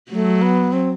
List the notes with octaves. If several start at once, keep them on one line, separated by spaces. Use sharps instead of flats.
F#3 A3
B3
C4